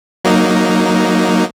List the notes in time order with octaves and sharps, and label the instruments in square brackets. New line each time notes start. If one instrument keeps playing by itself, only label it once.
[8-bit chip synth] F#3 A#3 D#4